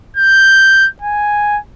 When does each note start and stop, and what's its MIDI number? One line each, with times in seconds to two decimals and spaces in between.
0.17 0.88 91
1.02 1.58 80